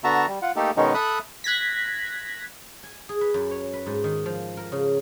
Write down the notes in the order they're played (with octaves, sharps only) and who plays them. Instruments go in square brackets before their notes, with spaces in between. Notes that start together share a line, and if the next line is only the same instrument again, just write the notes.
[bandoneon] D3 B3 F#4 E5 A5 A#5
G3
F4 F#5
A3 A#3 D#4 G4 A4
B2 D#3 G#3 B3 C#4 D#4
A4 E5 B5 D#6 F#6
[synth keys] F#6 G#6 A#6 B6
[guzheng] G#5
G#4
B4
F#2
C#5
B4
G#2
D#3
F3
A#4
C#3